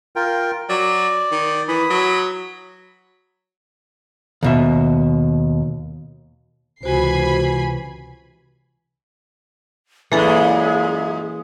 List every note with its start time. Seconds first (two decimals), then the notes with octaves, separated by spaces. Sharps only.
0.16 F4 A#4 G5
0.69 F#3 D5
1.32 D#3
1.68 E3 B5 D#6
1.90 F#3
4.43 D#2 B2 E5
6.83 C#2 C3 E3 F#4 C5 G#5 B5 C7
10.12 F#2 A#2 E3 G#3 A#3 G#4 A4